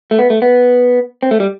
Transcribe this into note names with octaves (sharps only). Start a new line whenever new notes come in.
A3
B3
A3
B3
C4
A3
G3